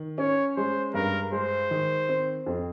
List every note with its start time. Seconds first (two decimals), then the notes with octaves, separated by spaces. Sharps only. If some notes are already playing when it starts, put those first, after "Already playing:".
Already playing: D#3
0.18 C#4 C#5
0.56 G#3 C5
0.94 G2 A#4
1.32 G#3 C5
1.71 D#3
2.09 C4
2.46 F2